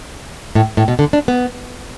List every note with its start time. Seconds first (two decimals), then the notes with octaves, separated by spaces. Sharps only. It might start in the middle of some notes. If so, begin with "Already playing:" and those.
0.55 A2
0.77 A2
0.88 B2
0.99 D3
1.13 D4
1.28 B3